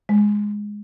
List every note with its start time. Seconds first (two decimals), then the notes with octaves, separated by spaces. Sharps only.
0.09 G#3